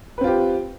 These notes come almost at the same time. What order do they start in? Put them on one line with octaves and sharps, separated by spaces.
B4 C4 F4 G4